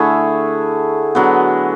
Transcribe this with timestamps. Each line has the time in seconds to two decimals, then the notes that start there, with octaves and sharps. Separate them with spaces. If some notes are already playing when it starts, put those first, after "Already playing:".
Already playing: D3 A3 E4 G#4
1.15 D3 F#3 B3